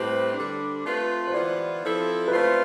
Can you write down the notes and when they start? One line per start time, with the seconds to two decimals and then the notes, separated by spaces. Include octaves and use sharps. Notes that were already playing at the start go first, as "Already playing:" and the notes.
Already playing: A2 G3 C4 G4 B4 C5
0.34 D3 G3 D4
0.84 A3 C4 F4 B4
1.28 C5
1.32 E3 B3 F4 D5
1.83 F3 C4 E4 A4
2.28 B4
2.32 A3 C4 F4 C5